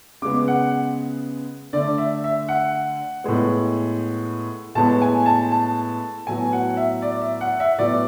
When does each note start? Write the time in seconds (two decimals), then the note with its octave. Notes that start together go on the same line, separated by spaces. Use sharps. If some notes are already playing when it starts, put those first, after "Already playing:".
0.22 C#3 G#3 B3 D6
0.48 F#5
1.73 D3 A3 D5
1.98 E5
2.24 E5
2.49 F#5
3.24 A2 G#3 B3
4.75 A2 G#3 B3 A5
5.02 G#5
5.26 A5
5.51 A5
6.27 A2 F#3 B3 G#5
6.53 F#5
6.77 E5
7.02 D5
7.21 E5
7.41 F#5
7.60 E5
7.78 A2 F#3 B3 D5